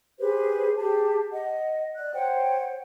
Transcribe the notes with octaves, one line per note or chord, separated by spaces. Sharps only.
G4 G#4 B4 C5
G4 G#4 A5
D#5 F#5
D5 F#6
C5 C#5 F#5 G5